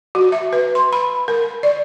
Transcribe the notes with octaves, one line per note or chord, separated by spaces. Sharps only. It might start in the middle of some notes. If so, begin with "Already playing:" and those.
F#4
E5
B4
C6
B5
A#4
D5